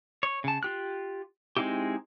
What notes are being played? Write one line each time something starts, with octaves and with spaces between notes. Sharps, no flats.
C#5
C#3 A5
F4 G4 F#6
G#3 C4 D#4 E4 G4